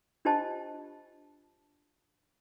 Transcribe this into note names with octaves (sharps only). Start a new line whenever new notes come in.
D4 F4 G4 C5 D#5 A5